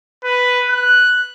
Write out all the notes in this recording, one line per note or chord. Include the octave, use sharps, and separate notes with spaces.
B4
F#6